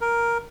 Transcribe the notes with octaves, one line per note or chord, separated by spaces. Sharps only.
A#4